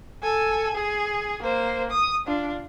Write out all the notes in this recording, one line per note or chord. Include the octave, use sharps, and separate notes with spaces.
A4 G#5
G#4
A#3 C5
D#6
D4 F4